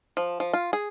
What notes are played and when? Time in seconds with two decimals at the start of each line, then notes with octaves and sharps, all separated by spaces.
0.17 F3
0.40 F3
0.53 F4
0.73 G#4